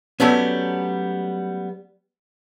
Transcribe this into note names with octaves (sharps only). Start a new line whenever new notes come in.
F#3 G3 A3 B3 C#4